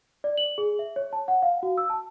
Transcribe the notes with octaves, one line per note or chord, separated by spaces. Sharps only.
D5
F#7
G#4
E5
C#5
A5
F#5
F5
F#4
E6
A5